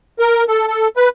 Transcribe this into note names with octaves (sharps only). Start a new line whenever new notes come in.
A#4
A4
A4
B4